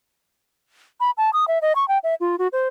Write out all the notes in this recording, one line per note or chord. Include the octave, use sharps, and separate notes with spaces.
B5
A5
D#6
E5
D#5
C#6
G5
E5
F4
F#4
C5